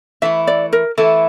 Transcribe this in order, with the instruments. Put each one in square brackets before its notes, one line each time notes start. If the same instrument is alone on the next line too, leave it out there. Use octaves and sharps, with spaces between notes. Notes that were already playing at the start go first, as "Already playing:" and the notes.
[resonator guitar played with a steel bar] E3 A3 E4 [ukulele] E5
[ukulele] D5
A#4
[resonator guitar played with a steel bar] E3 A3 E4 [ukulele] A4